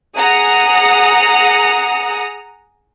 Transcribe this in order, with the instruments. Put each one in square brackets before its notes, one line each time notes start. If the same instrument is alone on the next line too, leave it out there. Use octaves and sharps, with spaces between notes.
[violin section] G#4 F#5 A#5 D#6